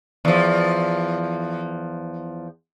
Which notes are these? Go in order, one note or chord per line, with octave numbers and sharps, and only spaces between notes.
E2 F3